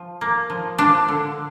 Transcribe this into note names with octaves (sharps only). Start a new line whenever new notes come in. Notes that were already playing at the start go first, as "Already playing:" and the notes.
Already playing: F3
A#3
F3
F3 D4
D3